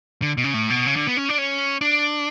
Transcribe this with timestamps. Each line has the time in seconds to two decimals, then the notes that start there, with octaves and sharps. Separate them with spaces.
0.22 D3
0.38 B2
0.44 C#3
0.54 A2
0.70 B2
0.86 C#3
0.96 D3
1.07 B3
1.17 C#4
1.29 D4
1.38 C#4
1.81 D4